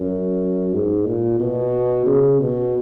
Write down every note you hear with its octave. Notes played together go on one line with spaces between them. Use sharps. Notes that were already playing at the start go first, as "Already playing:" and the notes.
Already playing: F#2
G#2
A#2
B2
C#3
B2